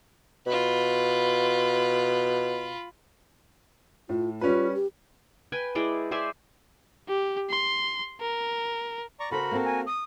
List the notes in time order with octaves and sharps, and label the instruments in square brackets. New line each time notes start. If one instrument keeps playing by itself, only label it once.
[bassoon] B2 [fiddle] F4 B5
[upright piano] A2 [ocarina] F4
[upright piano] G3 C#4 B4 [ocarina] F4
[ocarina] G4
[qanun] B4 G5 G#5
G#3 E4 D5 G5
C5 D5 E5 G#5
[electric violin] G4
C6
A#4
[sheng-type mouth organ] D5 A#5 C#6
[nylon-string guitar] C#3 A4 C5 [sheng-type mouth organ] F#4 A#4 [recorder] B5
[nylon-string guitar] A#3 C4 A4
[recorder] G#5
D#6